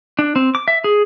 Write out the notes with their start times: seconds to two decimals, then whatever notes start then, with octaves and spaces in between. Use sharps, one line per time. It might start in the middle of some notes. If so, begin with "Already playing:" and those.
0.19 D4
0.36 C4
0.55 D6
0.68 E5
0.84 G#4